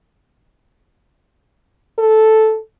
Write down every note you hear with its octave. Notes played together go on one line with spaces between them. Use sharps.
A4